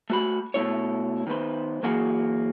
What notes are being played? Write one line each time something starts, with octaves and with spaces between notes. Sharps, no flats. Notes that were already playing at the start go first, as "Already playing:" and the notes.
A3 F#4 B5
B2 A3 E4 C#5
D#3 B3 B4 C5
E3 F#3 A#3 F#4 G#4